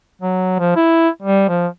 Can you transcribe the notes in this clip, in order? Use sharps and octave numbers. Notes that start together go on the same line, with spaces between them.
F#3
F3
E4
G3
F3